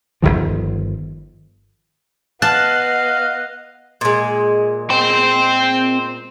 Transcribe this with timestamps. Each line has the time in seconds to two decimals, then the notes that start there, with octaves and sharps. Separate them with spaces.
0.22 G1 D2 D#3 F3
2.42 B3 D#5 F5 A5 F#6
4.01 A#2 G#3
4.90 C4 C5 G5